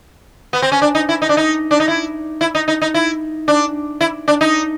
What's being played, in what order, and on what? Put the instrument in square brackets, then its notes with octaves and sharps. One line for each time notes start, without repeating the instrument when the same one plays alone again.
[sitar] B3
C4
C#4
D4
D#4
E4
D#4
D4
D#4
D4
D#4
E4
E4
D#4
D#4
D#4
E4
D4
E4
D4
D#4